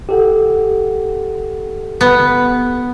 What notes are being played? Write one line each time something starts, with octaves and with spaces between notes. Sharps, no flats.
G4 A4 F#5
B3